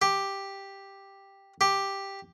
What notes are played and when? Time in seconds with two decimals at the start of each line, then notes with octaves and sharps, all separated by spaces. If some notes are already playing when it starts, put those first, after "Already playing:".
0.02 G4
1.61 G4